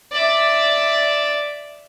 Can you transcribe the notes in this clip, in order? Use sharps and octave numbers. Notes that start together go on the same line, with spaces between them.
D5 E5